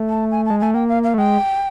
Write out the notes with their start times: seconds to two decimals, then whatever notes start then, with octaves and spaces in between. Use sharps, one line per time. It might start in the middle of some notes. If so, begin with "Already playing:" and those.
Already playing: A3
0.09 A5
0.31 G#5
0.46 G#3 A5
0.60 A3 G#5
0.74 A#3 G5
0.89 F5
1.03 F5
1.14 A3
1.17 G#3 G5